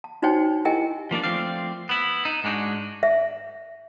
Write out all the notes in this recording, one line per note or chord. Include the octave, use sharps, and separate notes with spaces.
A5
D4 D#4 F#4 C5 C#5 G5
E4 G4 A#4 D#5 G5 G#5
F3 A#3 D4 D5
F3 A3 C4 D5 F5
B3 E4
D#4
G#2 G#3 D4 D#4 F#4
E5